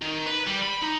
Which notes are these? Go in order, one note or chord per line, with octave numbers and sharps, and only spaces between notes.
D#3
B4
G3
B5
D#4